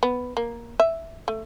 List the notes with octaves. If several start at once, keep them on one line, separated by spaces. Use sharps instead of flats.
B3
A#3
E5
A3